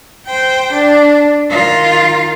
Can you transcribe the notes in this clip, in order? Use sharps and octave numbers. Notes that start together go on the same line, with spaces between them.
C5 G5
D4
D#3 F4